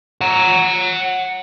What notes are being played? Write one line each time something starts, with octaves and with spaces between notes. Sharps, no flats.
F#5 A#5